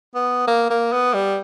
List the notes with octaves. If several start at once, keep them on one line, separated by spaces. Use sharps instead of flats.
B3
A#3
A#3
B3
G3